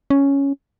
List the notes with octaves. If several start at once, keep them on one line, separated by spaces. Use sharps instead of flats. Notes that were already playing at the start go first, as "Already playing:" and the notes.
C#4